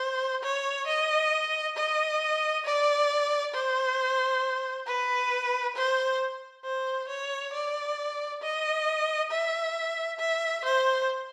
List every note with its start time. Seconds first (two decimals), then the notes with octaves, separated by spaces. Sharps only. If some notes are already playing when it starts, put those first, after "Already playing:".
Already playing: C5
0.43 C#5
0.87 D#5
1.77 D#5
2.65 D5
3.54 C5
4.87 B4
5.76 C5
6.65 C5
7.09 C#5
7.53 D5
8.42 D#5
9.31 E5
10.19 E5
10.65 C5